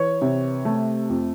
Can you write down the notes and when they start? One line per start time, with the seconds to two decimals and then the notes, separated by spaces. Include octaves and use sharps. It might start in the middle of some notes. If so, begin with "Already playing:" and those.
Already playing: E3 C#5
0.22 C3
0.65 A3
1.10 F2